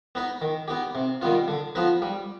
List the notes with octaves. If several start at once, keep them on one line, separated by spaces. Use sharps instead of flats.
B3 D#4 B4
D#3
B3 D#4 G4
C3
D#3 G3 B3 F4
D3
F3 B3 D#4 B4
G3